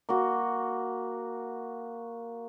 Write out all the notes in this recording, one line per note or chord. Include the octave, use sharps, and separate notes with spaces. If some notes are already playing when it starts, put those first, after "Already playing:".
A#3 F#4